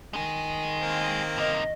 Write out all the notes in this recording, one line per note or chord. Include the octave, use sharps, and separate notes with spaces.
D#3 G#3 G#4
A#3 C4
C3 D#4 D#5